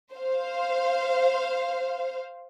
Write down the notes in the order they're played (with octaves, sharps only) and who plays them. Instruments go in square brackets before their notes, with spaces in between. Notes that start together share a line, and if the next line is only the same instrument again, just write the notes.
[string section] C5 F5